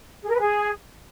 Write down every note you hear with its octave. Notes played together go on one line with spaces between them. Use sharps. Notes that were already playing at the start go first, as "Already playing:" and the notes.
G#4
A#4
B4
G#4